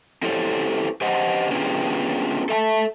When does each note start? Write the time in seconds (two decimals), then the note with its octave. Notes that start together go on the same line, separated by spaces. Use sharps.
0.22 C4 E4 G4 A4 C5 C#5
1.01 G4 C5 D#5 F#5
1.51 B3 C#4 D4 F4 G4 G#4
2.49 A4 E5 G#5 A5